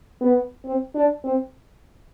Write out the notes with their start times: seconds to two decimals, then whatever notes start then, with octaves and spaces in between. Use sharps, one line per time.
0.21 B3
0.65 C4
0.95 D4
1.24 C4